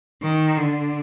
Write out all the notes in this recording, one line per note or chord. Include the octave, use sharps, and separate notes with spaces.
D#3
D3